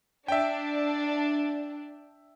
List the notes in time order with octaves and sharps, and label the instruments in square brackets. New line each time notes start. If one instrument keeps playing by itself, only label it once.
[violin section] D4 [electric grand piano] E5 G5